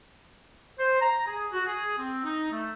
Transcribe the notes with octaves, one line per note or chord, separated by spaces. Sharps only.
C5
A#5
G#4
F#4
G#4
C4
D#4
A3